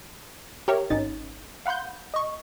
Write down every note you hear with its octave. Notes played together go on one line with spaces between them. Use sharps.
G4 A#4 C#5 E5
G#1 C#4 D#4 A6
F5 F#5 B5 C6 G6
D#5 C#6